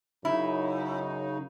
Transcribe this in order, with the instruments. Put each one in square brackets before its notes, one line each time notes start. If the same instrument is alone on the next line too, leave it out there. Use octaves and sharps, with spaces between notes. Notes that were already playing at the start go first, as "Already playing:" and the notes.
[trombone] F#2 [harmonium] C#3 D#4 [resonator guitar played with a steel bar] E4